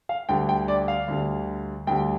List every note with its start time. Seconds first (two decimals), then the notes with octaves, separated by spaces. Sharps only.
0.09 F5
0.29 D2 D3 G3 G5
0.49 G5
0.68 D5
0.88 F5
1.08 D2 D3 G3
1.87 D2 D3 G3 G5